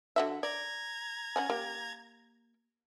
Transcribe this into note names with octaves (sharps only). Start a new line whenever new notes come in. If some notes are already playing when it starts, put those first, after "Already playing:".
D3 F#4 E5
D5 A#5 G#6
C#4 F#5 G#5
A#3 G4